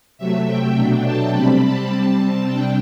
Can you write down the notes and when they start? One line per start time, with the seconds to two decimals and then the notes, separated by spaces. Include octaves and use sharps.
0.18 C3 F#3 A3 E5
0.47 G5
0.75 B2 F#3 A3 D4 G5
1.04 A5
1.33 C3 G3 C4 B5
1.61 A5
1.90 C3 G3 C4
2.47 C3 G3 D4 G5